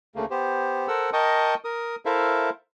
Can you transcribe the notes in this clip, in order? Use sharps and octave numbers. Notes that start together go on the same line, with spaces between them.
D2 C#3 A3 A#3
B3 G4 C5
A4 A#4 C5 F#5 E6
A#4 D#5 G5 A5 C#6 D#6
A#4 D#6
E4 A4 A#4 C5 E5 F5